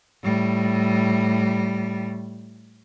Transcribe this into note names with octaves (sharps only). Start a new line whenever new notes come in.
A2 G3